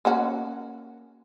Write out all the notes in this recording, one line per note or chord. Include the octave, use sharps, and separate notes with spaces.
A#3 C#4 F#4